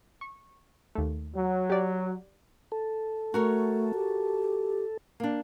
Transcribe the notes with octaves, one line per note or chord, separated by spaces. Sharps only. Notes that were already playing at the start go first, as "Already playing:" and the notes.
C#6
D#2 A3
F#3
G4 D5
A4
A3 F#4 A#4 C#5
G4
A#3 D4